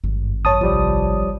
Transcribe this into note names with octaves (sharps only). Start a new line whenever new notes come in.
G#1 G2
F#2 C#5 A5 D#6
C2 F3 G3 D5